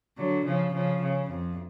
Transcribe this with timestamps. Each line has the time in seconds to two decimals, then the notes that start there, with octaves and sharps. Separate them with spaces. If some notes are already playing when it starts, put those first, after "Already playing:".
0.17 D3 F#3
0.46 C#3 F3
0.74 C#3 F3
1.02 C#3
1.31 F2